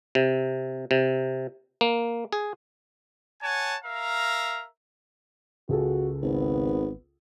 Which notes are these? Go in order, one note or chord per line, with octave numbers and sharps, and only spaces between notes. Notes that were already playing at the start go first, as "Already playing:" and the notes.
C3
C3
A#3
G#4
C#5 F#5 G#5 A5
A#4 E5 F5 A#5
C#2 F#4 G#4 A4
G#1 B3